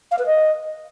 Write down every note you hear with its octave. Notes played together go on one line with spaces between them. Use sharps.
F5
B4
D#5